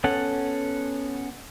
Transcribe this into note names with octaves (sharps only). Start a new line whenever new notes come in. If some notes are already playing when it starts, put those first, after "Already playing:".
B3 C#4 A4 F#5